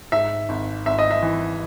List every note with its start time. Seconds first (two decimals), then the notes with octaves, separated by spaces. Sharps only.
0.12 G#2 E5
0.49 G#1
0.86 G#1 E5
0.99 D#5
1.11 E5
1.22 E3